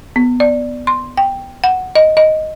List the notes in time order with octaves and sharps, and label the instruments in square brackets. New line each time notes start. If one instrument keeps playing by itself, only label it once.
[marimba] B3
D5
C6
G5
F#5
D#5
D#5